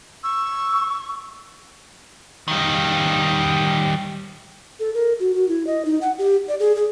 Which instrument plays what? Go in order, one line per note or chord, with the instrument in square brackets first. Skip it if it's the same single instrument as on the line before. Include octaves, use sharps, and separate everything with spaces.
[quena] C#6 [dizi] E6
[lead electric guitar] D#3 G3
[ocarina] A4
A#4
F#4
F#4
E4
D#5
D#4
F#5
G4
D5
G#4
G#4